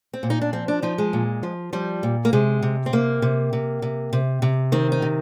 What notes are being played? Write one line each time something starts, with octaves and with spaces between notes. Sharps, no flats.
C4
A#2
D#4
D4
F3 C4
D4
F3 D#4
G#3
A#2
F3
F3 G3
A#2
A#3
C3 G#3
C3
C4
C3 A#3
C3
C3
C3
C3
C3
D#3 C4
D#4
C3